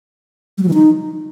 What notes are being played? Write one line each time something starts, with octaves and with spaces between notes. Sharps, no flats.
G3
F#3
E3
D#4